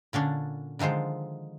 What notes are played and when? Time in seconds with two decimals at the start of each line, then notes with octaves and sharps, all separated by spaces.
0.13 A#2 D3 C#4 D4
0.79 D3 D#3 F3 G#3 C5